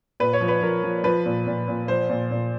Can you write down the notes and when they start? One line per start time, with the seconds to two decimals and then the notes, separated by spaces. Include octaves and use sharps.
0.20 A#2 B4
0.33 C#5
0.41 F3
0.48 B4
0.62 F3 A#4
0.83 F3
1.04 F3 B4
1.26 A#2
1.47 A#2
1.68 A#2
1.88 F3 C5
2.10 A#2
2.31 A#2